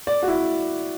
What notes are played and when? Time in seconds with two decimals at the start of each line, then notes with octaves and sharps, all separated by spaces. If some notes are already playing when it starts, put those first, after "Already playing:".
0.07 D5
0.22 F#4
0.28 E4